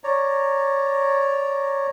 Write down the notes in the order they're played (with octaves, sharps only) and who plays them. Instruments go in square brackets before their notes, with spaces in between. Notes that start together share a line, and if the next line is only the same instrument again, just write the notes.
[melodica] C#5 D5 A#5